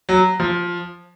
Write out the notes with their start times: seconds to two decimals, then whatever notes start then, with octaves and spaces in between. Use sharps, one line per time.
0.09 F#3
0.40 F3